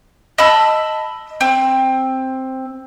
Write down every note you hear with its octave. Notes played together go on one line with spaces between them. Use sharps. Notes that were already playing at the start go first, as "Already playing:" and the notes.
D#5 A5 B5 E6
C4